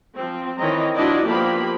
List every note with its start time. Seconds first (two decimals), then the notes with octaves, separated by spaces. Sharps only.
0.17 F3 C4
0.58 D#3 E3 C4 C#5 D#5 A#5
0.95 F3 D4 E4 F#4 D5 D#5
1.26 F3 A#3 B3 G4 B5